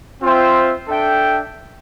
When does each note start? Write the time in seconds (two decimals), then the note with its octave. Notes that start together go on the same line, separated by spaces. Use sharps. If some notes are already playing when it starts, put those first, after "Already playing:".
0.21 C4 F4 C5 E5 G5
0.87 D4 A4 E5 G5